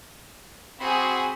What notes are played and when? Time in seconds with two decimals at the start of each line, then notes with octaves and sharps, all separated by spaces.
0.80 C4 F#4 G#4 B5 C6